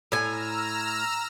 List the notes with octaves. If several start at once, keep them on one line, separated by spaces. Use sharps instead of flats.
A2 G#5 A#5 E6 F6